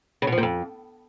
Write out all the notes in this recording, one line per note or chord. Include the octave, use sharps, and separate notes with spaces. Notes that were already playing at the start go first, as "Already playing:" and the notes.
C#3
B2
F3
A#2
F2